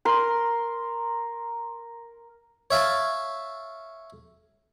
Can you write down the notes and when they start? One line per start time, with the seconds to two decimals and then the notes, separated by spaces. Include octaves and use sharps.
0.05 A#4 C6
2.71 C#5 E5 F5 A5